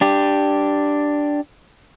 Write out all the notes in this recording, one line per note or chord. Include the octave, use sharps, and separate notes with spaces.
D4 G4